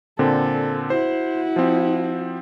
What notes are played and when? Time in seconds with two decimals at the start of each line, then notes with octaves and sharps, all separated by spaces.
0.19 A#2 D3 C4 A4
0.90 E4 F#4 C5
1.56 F3 C4